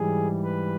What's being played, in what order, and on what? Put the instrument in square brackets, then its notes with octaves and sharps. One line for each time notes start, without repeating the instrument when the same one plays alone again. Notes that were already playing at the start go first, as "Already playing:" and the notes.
Already playing: [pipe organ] G#2 E3 G3 G#4
B4